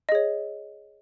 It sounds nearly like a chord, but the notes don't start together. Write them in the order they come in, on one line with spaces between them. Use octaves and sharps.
D#5 G#4 C#5